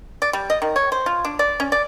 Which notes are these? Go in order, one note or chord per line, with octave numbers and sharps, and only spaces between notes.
D5
G3
D#5
D#3
C#5
C5
F4
D4
D5
C#4
D5